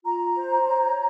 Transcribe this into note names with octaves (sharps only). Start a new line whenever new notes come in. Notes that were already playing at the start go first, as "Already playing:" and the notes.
F4 A#5
C5
C#5